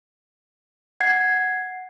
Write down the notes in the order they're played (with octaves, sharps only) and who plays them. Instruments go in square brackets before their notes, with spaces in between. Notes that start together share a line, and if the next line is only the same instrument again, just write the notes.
[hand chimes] F#5 G#6 C7